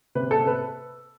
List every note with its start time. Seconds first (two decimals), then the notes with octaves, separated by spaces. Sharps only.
0.15 C3 B4
0.31 A4
0.38 C3
0.47 B4